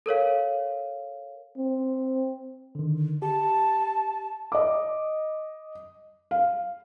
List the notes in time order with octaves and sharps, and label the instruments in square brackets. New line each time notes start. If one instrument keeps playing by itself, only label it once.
[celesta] A4 A#4 C#5 F5
[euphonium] C4
[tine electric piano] D3 D#3
[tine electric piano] G4 [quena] A5
[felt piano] D#5 D6
F5